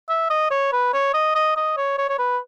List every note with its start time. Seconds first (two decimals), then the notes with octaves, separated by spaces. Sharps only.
0.09 E5
0.30 D#5
0.51 C#5
0.72 B4
0.93 C#5
1.14 D#5
1.35 D#5
1.57 D#5
1.77 C#5
1.98 C#5
2.09 C#5
2.19 B4